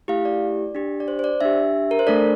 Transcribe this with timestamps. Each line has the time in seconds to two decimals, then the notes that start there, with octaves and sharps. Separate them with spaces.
0.08 A3 E4 G4 F5
0.25 D5
0.75 D4 G4
1.00 D5
1.08 C5
1.19 C5
1.24 D5
1.41 D4 G4 E5
1.91 A#4
1.99 C5
2.07 A3 D4 A4 D5